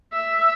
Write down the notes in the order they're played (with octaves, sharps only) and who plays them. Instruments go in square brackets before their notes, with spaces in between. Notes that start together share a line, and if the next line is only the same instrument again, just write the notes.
[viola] E5